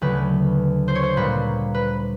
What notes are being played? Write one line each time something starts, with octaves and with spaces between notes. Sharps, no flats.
D2 C#3 F#3 B4
C5
C#5
C5
A#2 G3 A#3 B4
B4